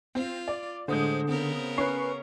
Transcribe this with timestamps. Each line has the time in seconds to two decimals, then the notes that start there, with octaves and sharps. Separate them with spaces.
0.15 C4 F4
0.48 D5
0.88 A2 D3 G#3 C5 D#6 G6
1.29 C#3 B3 C4 A#4
1.78 C#4 B4 G#5 C#6 C7